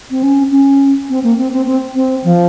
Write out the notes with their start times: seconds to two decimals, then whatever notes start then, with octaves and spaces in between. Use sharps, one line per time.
0.11 C4
0.23 C#4
0.52 C#4
1.10 C4
1.24 A#3
1.38 C4
1.53 C4
1.66 C4
1.95 C4
2.24 F3